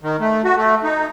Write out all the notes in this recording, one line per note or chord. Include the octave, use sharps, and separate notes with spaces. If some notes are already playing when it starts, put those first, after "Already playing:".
D#3
A3
F#4
A3
D#4